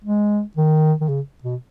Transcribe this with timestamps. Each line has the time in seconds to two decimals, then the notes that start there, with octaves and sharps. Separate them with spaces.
0.05 G#3
0.57 D#3
1.01 D#3
1.09 C#3
1.44 B2